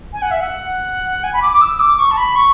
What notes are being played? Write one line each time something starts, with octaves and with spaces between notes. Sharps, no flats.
G#5
F#5
E5
F#5
G#5
B5
D6
D6
E6
D6
C#6
A5
B5
C#6